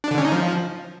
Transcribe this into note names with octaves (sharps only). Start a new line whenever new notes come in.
D4
D3
C#4
D#4
F3